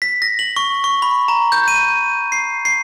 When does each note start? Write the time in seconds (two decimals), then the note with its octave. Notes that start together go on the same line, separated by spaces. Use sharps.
0.02 B6
0.22 A#6
0.39 F#7
0.56 C#6
0.84 C#6
1.02 B5
1.28 A#5
1.52 G6
1.68 D#7
2.32 C7
2.65 C7